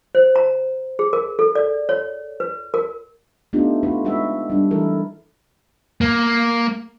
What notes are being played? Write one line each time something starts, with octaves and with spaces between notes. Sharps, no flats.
C5
A#5
G#4
A#4
A4
D5
C#5
B4
A#4
A3 B3 D4 D#4 F4 G4
A3 F4 F#4 B4
G#3 C#4 D#4 F#4 B4 E5
G3 D4
E3 A3 E4 A4 A#4
A#3